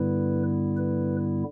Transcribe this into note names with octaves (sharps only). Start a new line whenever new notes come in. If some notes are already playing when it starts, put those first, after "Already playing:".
Already playing: G2 D3 G3 B3 E4 B4
B4